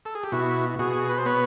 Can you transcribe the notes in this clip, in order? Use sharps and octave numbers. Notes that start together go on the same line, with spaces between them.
A4
G#4
G4
B2 E4 F#4
B2 F#4 G#4
B4
C5
B3 B4 C#5